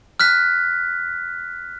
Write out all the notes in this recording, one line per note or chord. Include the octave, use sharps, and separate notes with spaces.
F6 F#6 B6